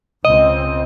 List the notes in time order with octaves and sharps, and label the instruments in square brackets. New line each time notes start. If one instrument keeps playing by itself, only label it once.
[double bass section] C#2 C4 [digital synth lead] D#5